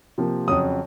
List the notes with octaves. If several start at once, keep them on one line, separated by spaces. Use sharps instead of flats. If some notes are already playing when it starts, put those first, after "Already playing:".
C3 F3 A#3
F2 C#3 F#3 D#6